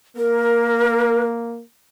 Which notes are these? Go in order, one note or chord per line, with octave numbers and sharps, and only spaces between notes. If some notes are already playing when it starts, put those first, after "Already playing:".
A#3 A#4